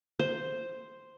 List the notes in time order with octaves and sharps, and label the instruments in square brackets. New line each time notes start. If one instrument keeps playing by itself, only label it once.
[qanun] C5